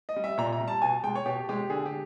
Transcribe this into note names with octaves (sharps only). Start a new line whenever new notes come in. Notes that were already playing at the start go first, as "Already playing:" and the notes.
D#5
G3
E5
A#2 A#5
A#5
G3
A5
B2 G#5
G#3 G5
C#5
B2 G4
G#3 G4
D3 G#4
G4